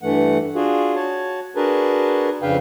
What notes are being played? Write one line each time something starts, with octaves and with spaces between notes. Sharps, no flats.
G2 E3 A3 F#5
D4 F4 F#4 G#4
F#4 C#5 A5
D4 F#4 G#4 A#4 B4 A5
F2 C#3 D4 B4 F5 G5